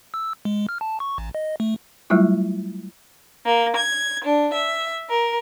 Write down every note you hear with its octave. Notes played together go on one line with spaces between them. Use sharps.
E6
G#3
F6
A5
C#6
A1
D#5
A3
F#3 G3 A3 E4 F4
A#3
G#6
D4
E5
A#4